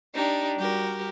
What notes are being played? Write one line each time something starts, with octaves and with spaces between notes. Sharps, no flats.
D4 D#4 G4
G3 F#4 G4 A#4